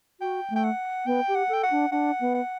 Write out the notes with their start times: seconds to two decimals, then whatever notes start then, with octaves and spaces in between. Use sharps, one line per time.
0.20 F#4 G5
0.50 A3
0.56 G5
0.64 F#5
1.06 B3 G5
1.28 G4
1.35 F#5
1.49 A4 G5
1.63 F#5
1.71 D4
1.91 D4 F#5
2.20 B3
2.35 F#5